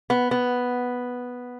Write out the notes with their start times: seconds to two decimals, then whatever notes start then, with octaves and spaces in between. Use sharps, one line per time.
0.10 B3
0.31 B3